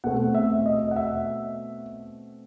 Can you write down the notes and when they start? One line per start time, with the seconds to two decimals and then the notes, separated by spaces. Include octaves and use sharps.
0.04 B2 A3 C4 F#5
0.35 E5
0.66 D#5
0.91 F#5
0.96 E5